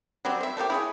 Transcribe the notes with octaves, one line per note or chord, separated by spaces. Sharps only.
F#3 G3 C4
C5 E5
A3 A#3 F4 G4
E4 G#4 C#5